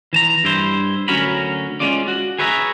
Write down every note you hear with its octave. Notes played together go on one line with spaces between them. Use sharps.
E3 A5 A#5
G2 E4 C5
D2 F#3 C#4 F#4 A#4 B5
G#3 C#4 F4 D5
F#4
G#4 B4 C#5 E5 A#5